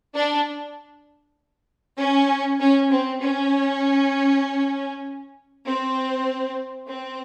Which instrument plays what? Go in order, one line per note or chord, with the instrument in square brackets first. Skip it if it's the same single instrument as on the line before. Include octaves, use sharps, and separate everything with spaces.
[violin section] D4
C#4
C#4
C4
C#4
C4
C4